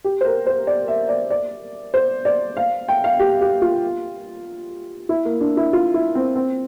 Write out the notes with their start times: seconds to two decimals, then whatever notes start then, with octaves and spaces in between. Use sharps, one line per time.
0.04 G4
0.21 C5
0.25 A#4
0.47 C5
0.67 D5
0.88 E5
1.09 D5
1.31 D5
1.94 C5
2.25 D5
2.57 F5
2.88 G5
3.04 F5
3.19 G4
3.41 G4
3.62 F4
5.09 E4
5.25 A#3
5.41 D4
5.57 E4
5.73 F4
5.94 E4
6.15 C4
6.35 C4